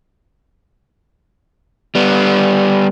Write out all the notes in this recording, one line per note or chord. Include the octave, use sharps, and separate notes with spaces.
G3 B3